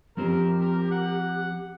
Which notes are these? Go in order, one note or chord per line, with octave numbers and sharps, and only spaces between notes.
F3 C4 G4 A#4 C5
A#4
F#5